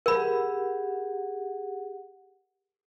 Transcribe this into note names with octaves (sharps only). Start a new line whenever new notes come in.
G4 G#4 A#4 F#5 B5